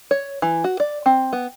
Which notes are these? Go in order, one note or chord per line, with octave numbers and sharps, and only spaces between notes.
C#5
E3
F#4
D5
C4
B3